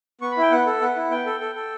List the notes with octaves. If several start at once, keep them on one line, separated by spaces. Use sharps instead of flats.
B3 C#6
B5
E4
G5
B3 F#5
A4
B3 F#5
E4
B3 G5
A4
A4
A4